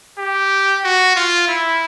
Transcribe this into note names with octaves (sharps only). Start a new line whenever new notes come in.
G4
F#4
F4
E4